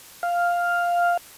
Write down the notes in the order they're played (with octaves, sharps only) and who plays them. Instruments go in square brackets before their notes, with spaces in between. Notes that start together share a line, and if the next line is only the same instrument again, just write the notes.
[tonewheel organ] F5